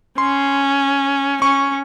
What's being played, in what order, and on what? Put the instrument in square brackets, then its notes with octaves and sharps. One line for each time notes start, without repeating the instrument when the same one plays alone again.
[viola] C#4 [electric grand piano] C6
[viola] C#4 [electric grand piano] C#6